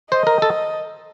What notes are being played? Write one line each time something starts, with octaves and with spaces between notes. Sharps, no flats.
C5 D#5
A#4
A4